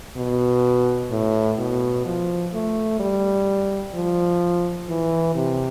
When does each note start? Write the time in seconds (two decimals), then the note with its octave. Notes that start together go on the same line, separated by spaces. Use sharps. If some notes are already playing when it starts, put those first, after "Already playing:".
0.17 B2
1.11 A2
1.58 B2
2.06 F3
2.53 A3
3.00 G3
3.94 F3
4.89 E3
5.36 C3